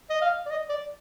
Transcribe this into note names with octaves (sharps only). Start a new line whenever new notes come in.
D#5
F5
D5
D#5
D5